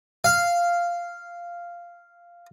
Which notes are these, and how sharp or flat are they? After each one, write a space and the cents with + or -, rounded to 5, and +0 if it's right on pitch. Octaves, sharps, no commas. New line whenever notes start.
F5 -5